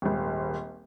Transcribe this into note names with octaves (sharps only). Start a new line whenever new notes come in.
D#1 G#1